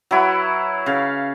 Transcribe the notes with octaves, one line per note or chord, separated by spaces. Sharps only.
F#3 E4 B4
C#3 F5